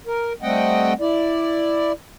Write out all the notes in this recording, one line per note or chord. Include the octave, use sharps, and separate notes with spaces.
A#4
G3 A3 C4 D#5 F#5 G5
E4 D5